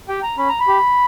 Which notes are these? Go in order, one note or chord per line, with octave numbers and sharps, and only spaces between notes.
G4 G5
A#5
C#4 B5
A#5
B5
G4